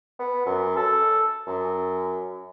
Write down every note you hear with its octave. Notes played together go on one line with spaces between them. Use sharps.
B3
F#2
A4
F#2